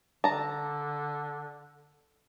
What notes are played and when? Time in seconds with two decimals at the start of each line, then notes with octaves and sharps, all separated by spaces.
0.24 D3 A5 A#5